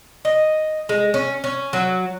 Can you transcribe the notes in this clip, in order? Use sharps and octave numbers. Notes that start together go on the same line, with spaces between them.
D#5
G#3
C#4
C#4
F#3